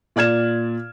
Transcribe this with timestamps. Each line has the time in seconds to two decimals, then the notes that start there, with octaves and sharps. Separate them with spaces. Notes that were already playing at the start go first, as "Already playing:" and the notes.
0.16 A#2 D5 F6 G#6 E7